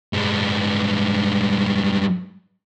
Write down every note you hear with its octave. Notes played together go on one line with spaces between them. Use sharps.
G2 G#3